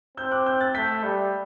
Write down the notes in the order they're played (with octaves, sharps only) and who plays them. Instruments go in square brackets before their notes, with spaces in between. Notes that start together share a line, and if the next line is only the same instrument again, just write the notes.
[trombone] C4 [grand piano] E6 G6
[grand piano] D6 F#6
E6 G6
F#6 A6
[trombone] A3 [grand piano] G6 B6
[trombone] G3